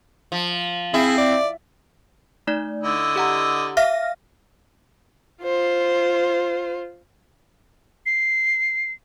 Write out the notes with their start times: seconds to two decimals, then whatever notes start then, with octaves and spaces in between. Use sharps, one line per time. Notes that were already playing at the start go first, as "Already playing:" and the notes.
0.32 F3
0.94 C4 E4 G#4
1.18 D5
2.47 A3 D#4 D5
2.83 D3 E4 D#5
3.16 G4 F#5 A#5
3.77 E5 F5 F6 A#6
5.43 F4 C5
8.06 C7